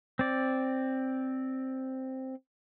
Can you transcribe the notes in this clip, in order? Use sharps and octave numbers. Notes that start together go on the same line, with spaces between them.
C4 D5